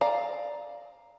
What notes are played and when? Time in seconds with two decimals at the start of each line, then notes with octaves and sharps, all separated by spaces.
0.01 D5 F5 A#5